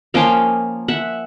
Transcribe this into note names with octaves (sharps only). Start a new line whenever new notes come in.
F3 A#3 C#4 F5 G5
E5 F#5